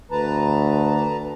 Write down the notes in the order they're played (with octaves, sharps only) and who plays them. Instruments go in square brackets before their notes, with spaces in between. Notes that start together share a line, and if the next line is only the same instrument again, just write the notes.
[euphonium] D2 [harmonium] B4 A5 A#5